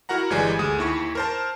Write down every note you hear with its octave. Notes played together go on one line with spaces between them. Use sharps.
E4 F#4 A#4 F#5 A#5
G1 E3 G3 G#3 G#5
D2 G#4 D#6
D#2 E4 C#6
A#4 C5 A5